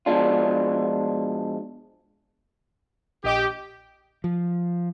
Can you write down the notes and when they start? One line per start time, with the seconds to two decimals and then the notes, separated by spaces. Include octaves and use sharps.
0.06 B2 F3 G#3 D4 F4
3.24 A#1 G4 D#5 D6
4.24 F3